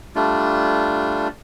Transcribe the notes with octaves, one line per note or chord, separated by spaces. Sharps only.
G3 A3 D4 F4